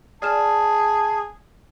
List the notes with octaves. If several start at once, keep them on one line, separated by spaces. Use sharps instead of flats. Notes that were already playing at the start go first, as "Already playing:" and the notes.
G#4 D5 A5 F6 E7